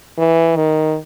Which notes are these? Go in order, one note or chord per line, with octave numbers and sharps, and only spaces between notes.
E3
D#3